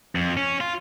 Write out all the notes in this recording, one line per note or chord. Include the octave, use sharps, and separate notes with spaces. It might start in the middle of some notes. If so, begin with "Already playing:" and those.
F2
C#4
F4